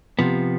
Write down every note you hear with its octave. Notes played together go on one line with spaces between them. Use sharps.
C3 F3 B3